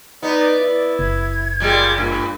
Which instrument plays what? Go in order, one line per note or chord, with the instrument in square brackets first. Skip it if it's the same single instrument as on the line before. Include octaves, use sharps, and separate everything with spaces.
[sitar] B3 [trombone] D#4 [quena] D5
[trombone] E4 [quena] D5
[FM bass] F#1 [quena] G#6
[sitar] A#2 G3 G#3
[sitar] G2 [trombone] A#2